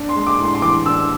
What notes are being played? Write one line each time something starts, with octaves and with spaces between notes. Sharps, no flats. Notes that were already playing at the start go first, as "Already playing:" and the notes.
Already playing: D4
C6
G#3
D6
A2
C6
C6
E3 D6
D4 E6